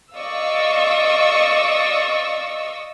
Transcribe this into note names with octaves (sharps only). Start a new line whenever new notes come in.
D5 D#5 F5 C#6 D#6 E6